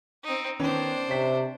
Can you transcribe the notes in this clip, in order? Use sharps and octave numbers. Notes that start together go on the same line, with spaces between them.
C4 D#4
D#3 B3 C#4 D4 C5
C3 C#5 B6